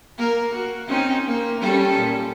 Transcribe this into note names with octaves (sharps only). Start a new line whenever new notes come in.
A#3 A#4
F#4
C4 C#4 D#4
A#3
G3 C#4 A4
A#2